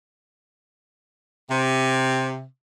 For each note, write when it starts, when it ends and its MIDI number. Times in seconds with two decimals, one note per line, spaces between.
1.50 2.44 48